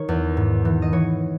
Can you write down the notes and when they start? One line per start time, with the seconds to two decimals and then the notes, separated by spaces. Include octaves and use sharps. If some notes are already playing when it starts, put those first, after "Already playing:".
Already playing: D#3 C#5
0.09 E2
0.37 G#2
0.65 E3
0.82 D#5
0.93 E3 C#5